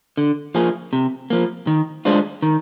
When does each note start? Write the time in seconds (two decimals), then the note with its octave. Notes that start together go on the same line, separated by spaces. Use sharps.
0.17 D3
0.55 F3 A#3 F4 G#4
0.93 C3
1.30 F3 A#3
1.67 D#3
2.05 G#3 D4 F4 C5
2.42 D#3